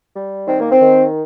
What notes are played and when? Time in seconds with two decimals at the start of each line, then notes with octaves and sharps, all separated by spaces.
0.15 G3
0.48 D#3 C4
0.60 A#3
0.72 C4
0.81 D#3